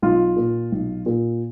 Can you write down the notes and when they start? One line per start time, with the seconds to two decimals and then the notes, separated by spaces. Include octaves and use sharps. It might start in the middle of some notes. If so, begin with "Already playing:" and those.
0.02 B1 F4
0.36 A#2
0.72 B1
1.06 A#2